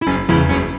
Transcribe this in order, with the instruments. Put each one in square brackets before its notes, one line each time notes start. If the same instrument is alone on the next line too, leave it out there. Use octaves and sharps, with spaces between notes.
[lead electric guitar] E4
[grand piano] F#1 [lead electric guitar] C#4
[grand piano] E2 C#3 [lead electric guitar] E4
[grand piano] F#1 [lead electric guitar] C#4